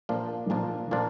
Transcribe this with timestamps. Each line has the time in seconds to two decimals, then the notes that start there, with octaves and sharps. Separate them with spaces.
0.09 A#2 F3 A#3 D4 F4
0.50 A#2 F3 A#3 D4 F4
0.91 A#2 F3 A#3 D4 F4